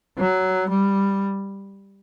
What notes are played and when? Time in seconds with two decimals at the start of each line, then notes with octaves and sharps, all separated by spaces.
0.18 F#3
0.69 G3